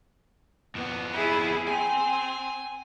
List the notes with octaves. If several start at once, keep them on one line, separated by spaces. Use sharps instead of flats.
F2 B3
E4 G#4
C4 G#5